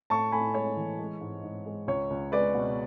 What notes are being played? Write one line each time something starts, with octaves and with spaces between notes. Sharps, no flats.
A2 A5 C#6
A2 G#5 B5
G#3 C#5
E3
G#3
G#2
G#2
G#3
C#2 C#5
C#2
G#3 B4 D5
B2